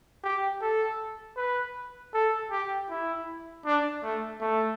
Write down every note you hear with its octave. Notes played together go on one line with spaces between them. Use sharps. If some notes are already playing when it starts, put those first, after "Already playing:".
G4
A4
B4
A4
G4
E4
D4
A3
A3